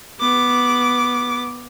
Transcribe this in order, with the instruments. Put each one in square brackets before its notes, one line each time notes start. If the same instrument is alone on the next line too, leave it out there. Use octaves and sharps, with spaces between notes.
[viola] B3 D6